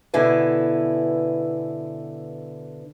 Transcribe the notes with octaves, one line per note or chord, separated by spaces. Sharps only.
B2 D3 E4 B4 G#5